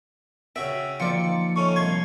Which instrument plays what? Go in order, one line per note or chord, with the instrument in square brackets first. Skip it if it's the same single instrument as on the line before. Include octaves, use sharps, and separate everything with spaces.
[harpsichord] C#3 F#4 G5 [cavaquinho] E5
[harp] D#3 F3 A#3 [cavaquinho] F4 D5 [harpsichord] G5 [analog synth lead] C#7
[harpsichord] A3 C#4 D#4 [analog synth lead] C#6
[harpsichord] C2 C6 C#6 [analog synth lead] G#6